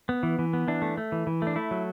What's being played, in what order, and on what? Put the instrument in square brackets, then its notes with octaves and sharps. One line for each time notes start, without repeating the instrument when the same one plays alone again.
[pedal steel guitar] B3
E3
E3
B3
E3 D4
A3
A3
E3
E3
A3 D4
A3 E4
F#3